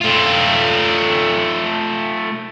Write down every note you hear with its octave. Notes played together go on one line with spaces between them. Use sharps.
A3 F4